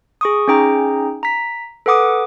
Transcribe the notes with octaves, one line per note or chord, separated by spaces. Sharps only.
G#4 C#6 D#6
C#4 D#4 G#4 G5 A#5
A#5 B6
A4 B4 F#5 D6 D#6